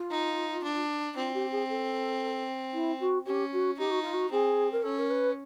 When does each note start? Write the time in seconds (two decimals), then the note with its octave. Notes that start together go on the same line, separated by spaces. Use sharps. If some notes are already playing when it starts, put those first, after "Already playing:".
Already playing: F4
0.11 D#4
0.64 D4
1.16 C4 F4
1.34 G4
1.51 G#4
1.69 A4
2.73 E4
3.00 F#4
3.26 C#4 G4
3.52 F#4
3.78 D#4 G4
3.90 F#4
4.02 F4
4.13 F#4
4.31 C4 G#4
4.72 A#4
4.83 C#4 A4
4.98 A#4
5.10 B4